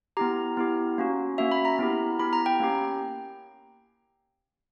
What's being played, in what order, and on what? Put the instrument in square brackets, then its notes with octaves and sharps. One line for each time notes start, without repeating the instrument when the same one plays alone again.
[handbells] B3 E4 G4 A#5
B3 E4 G4
A#3 C#4 F#4
A#3 C#4 F#4 E5
B5
A#5
B3 E4 G4
B3 E4 G4 B5
A#5
G5
A#3 C#4 G4